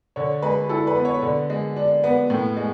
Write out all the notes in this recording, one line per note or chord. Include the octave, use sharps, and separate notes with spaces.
D3 C#5
G#3 B4
E4 A4
B4
B3
C#5
D3
G#3
D4
B3
A2
G#3